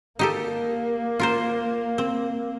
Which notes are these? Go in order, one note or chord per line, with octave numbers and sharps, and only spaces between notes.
A#3 D#4 G4 A4
F4 A#4 C5
C4